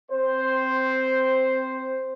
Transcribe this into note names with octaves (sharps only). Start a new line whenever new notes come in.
C4 C5